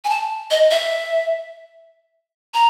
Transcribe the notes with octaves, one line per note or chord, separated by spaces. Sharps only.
G#5
A5
D#5
E5
A#5